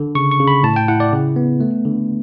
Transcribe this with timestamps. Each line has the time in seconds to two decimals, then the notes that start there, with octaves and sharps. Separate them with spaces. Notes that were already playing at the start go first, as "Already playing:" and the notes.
Already playing: D3
0.15 C#3 C#6
0.31 C#6
0.39 C#3
0.48 B5
0.63 A2 A5
0.76 G5
0.88 E4 F#5
1.00 D5
1.13 C#3
1.36 B3
1.60 A3
1.85 D3